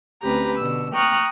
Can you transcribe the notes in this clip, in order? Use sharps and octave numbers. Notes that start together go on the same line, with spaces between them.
D2 C4 C#4 G4 B4 A#5
B2 D3 E6
G5 A#5 C#6 D#6 F6 F#6